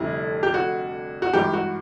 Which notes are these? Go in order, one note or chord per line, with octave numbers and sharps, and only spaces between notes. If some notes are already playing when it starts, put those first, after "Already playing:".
Already playing: F1 F2 D3 G3 E4
G4
F#4
F#4
G#1 G2 E3 G4
F#4